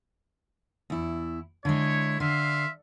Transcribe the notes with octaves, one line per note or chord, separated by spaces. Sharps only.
E2 E4
D3 G#3 E4 C#5
D3 E5 F5 C6